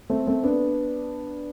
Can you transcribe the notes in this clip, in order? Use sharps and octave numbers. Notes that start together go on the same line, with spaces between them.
A3 C4
A3 C4
B3 D4